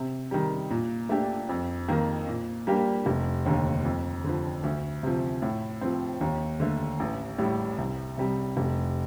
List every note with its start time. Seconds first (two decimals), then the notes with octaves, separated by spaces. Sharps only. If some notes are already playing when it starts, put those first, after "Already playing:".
Already playing: C3
0.31 D#3 G3
0.71 A#2
1.09 A3 D4 G4
1.49 F2
1.88 D#3 A#3
2.28 A#2
2.67 G3 A#3 D4 G4
3.06 F1
3.46 D#2 D3
3.85 F2
4.24 D3 F3
4.63 D2
5.03 C3 F3
5.42 A2
5.81 F3 C4
6.21 D#2
6.60 D3 A3
7.00 A1
7.38 A2 G3
7.78 C2
8.18 C3 G3
8.57 F1